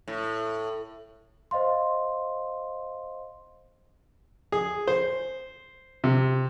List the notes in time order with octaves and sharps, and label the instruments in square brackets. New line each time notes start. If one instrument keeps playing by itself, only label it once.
[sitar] A2
[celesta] C5 D#5 F5 C6
[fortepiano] G#4
C5
C3